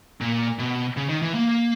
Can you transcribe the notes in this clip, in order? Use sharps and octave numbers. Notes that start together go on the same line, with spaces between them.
A#2
B2
C#3
D#3
E3
A#3